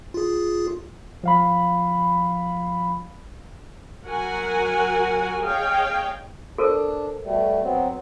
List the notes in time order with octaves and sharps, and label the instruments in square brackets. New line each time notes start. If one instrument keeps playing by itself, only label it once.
[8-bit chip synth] F4 G#4
[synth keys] F3 F5 B5
[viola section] F#3 F#4 A#4 F#5 G#5
G#4 C#5 D#5 F5 G5
[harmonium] D4 [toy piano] A4 A#4 C5
[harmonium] B2 G3 A3
F#3 B3 C4